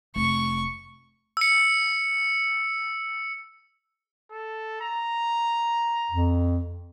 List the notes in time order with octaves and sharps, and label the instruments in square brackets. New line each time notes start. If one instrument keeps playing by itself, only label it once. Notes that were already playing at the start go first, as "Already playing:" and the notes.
[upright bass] F1 [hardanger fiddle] C#6
[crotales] E6 C#7
[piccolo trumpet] A4
A#5
[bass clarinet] F2